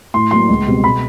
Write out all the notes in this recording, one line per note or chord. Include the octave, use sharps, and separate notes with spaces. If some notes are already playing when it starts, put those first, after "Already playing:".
A2 C6
F#3 A#3 C6
C#2
B2 G3 C4
B2 B5